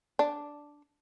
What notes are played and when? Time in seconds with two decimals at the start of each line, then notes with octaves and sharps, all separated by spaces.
0.19 D4